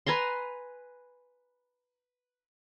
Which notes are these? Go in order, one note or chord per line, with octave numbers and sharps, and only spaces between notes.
B4 G#5 A#5 C6